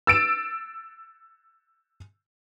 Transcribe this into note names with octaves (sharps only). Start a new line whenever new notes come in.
E6 A6 D7 E7